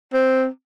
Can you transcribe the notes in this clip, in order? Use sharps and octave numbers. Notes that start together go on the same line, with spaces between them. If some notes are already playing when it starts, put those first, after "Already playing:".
C4